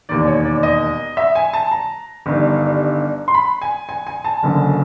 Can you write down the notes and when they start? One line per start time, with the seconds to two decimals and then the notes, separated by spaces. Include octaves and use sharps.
0.09 E1 D#2 D#3 D5
0.27 C#5
0.45 D5
0.63 D#5
1.17 E5
1.35 G#5
1.53 A5
1.72 A#5
2.26 G1 G2 D#3
3.28 C6
3.34 B5
3.62 G#5
3.89 G#5
4.07 G#5
4.24 A5
4.43 F#1 F#2 D3